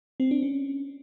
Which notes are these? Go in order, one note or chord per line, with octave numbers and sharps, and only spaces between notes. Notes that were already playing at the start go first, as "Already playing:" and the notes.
C4
D4
C#4